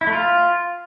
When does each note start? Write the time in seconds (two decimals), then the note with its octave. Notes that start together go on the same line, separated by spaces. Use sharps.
0.01 E4
0.07 A3
0.13 F4